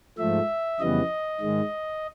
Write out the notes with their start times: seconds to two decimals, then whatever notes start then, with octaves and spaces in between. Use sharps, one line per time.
0.18 G#2 F3 A3 E5
0.79 F2 C#3 E3 G3 B3 D#5
1.40 G#2 D#3 G#3